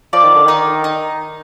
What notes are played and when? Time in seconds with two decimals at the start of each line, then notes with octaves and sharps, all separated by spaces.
0.13 F3 D5
0.24 D#3
0.34 D3
0.45 D#3 D#4
0.84 D#4